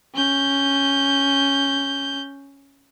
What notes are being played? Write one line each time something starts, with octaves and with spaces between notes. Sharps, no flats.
C#4 G6